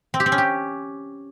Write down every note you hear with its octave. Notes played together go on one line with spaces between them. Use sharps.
C4
G4
C4
C#4
G4